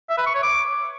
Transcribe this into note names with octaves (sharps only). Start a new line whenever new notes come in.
E5
B4
C#6
C#5
D6